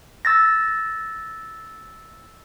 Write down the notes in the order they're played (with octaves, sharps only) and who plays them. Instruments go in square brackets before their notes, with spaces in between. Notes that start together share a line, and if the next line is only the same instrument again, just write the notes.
[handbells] E6 A6 A#6